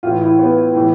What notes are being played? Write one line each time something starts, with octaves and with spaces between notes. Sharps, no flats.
A2 E3 F4
E4
B3
A2 E3